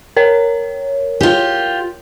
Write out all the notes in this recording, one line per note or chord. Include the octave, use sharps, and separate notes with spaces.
A#4 C#5
F4 G4